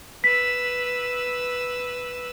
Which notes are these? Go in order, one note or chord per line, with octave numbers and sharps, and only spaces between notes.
B4 E6 B6